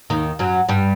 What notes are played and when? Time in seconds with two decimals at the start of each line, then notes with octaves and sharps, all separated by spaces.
0.10 D#2 D#3
0.39 F#2 F#3
0.69 G2 G3